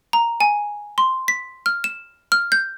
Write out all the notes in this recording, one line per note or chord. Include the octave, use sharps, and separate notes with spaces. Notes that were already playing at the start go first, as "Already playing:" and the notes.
A#5
G#5
C6
B6
F6
E7
F6
G6